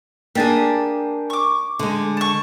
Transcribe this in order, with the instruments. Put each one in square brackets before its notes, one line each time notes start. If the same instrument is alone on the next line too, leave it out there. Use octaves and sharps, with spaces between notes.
[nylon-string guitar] A#3 D4 G#4 [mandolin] G4 A5
[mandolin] C#6 D6
[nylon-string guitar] D3 G#3
[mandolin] A5 C#6